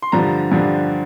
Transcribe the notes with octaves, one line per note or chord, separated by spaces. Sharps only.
C6
G2 D3 F3 A#5
G2 D3 F3